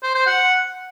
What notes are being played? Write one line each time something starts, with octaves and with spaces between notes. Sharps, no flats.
C5
C5
F#5